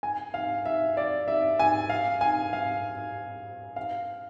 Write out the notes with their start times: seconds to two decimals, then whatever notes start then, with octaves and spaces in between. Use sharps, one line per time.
0.03 G#5
0.34 F5
0.65 E5
0.97 D5
1.28 E5
1.59 G#5
1.89 F5
2.21 G#5
2.53 F5
3.76 F5